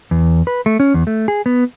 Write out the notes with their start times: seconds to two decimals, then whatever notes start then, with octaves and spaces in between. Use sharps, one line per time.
0.11 E2
0.47 B4
0.66 A3
0.80 C#4
0.94 E2
1.07 A3
1.28 G#4
1.46 B3